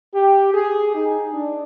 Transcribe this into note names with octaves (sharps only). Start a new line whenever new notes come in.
G4
G#4
D#4
D4